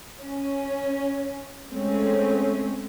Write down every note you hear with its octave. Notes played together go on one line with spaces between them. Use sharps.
C#4
G#3 A3 C4 C#4